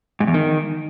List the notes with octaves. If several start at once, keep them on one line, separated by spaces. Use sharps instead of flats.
G#2
E2
D#3